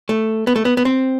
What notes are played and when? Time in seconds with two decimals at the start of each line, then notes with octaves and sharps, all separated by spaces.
0.09 A3
0.47 B3
0.56 A3
0.65 B3
0.77 B3
0.85 C4